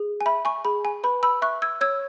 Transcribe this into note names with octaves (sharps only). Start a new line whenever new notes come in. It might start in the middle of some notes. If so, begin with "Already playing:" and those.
Already playing: G#4
G#5
E5 B5
G#5 C#6
G#4 B5
G#5
B4 B5
B5 E6
E5 C#6 F#6
E6 G#6
C#5 E6 G#6